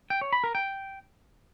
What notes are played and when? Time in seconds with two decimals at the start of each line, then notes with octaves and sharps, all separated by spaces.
0.10 G5
0.21 C#5
0.33 B5
0.44 A#4
0.55 G5